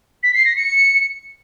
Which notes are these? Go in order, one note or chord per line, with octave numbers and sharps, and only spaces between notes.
B6
C7
A#6
C#7